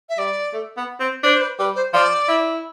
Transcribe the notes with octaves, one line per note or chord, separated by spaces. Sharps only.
E5
G3 D5
A3
B3
C4
D4 C5
C5
B4
G3 B4
C5
F3 D5
E4